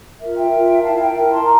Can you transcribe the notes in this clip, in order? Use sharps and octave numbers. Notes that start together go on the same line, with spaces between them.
F4 A#4 E5
E5 G5
F4 A#4
E4 A#4 F5 A5
E5 G5
E4 A#4 E5
A5 C6
A#5